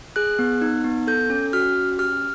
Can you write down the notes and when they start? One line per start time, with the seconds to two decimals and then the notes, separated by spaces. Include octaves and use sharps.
0.16 G#4 F#6
0.39 B3
0.62 D#4
0.84 B3
1.07 A4 G6
1.30 C#4
1.53 F#4 F6
1.75 C#4
1.99 G4 F6